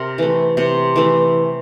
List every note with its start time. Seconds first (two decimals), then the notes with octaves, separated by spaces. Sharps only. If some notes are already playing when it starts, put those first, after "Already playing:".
Already playing: C3 A#4
0.18 E3 A3
0.57 C3
0.96 E3 A3